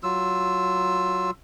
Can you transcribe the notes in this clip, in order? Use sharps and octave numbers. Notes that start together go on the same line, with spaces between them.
F#3 F4 E6